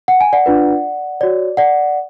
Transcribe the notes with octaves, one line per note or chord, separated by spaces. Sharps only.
F#5
G#5
D5 F#5
D4 F4 B4
F#4 C#5 D5
D5 F#5